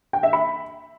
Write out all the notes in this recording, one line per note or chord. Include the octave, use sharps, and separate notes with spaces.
G5
E5
B5